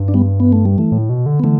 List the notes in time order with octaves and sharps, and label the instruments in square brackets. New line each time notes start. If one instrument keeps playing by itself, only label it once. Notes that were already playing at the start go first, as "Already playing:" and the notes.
Already playing: [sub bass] G2
[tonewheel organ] D4
G3 B3
B3
A3
G3
E3 A3
[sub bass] A2
B2
D3
[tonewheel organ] B3
[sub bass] D3 [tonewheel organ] E3 A3